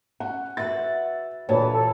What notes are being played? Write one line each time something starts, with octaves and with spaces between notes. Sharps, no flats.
C#4 F#5
F#4 B4 E5 F#5 A6
D2 G2 A#2 E3 C#5 A5 B5
A4